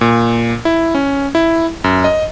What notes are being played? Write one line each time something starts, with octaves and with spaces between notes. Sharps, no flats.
A#2
E4
C#4
E4
F#2
D#5